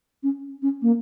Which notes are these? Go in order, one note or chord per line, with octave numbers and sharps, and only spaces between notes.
C#4
C#4
A#3